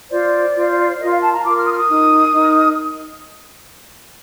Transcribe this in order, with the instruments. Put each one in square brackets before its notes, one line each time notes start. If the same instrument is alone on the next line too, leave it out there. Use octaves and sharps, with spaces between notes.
[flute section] F4 C5 D5
F4 C5
F4 A#4 D#5
F5
A5
A#5
F4 A#4 D6
F6
D#6
F6
D#6
D#4 A#4
D#4 A#4